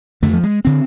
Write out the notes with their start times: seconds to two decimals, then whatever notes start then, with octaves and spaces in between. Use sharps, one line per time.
0.22 F2 D3 A3
0.34 F3
0.43 G#3
0.65 D3 C4